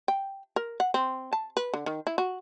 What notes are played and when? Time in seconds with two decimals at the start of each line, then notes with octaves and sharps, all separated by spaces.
0.08 G5
0.56 A#4
0.80 F#5
0.94 C4
1.33 A5
1.57 B4
1.74 D3
1.86 D#3
2.07 E4
2.18 F#4